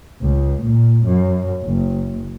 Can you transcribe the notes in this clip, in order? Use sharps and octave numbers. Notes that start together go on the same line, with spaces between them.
C#2
A#2
F#2
F#1